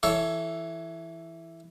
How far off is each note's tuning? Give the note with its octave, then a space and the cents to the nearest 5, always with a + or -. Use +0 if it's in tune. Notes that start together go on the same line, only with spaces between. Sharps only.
E3 +5 A4 +0 C#5 +10